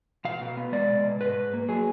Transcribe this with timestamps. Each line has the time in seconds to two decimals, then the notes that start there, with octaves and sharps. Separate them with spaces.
0.25 B2 F5
0.41 B2
0.57 B3
0.72 G#3 D5
0.89 B2
1.05 B2
1.21 G#2 B4
1.37 G#2
1.53 A#3
1.69 F#3 G#4